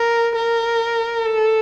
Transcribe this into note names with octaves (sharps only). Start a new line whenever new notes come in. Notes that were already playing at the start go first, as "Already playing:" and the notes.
Already playing: A#4
A#4
A4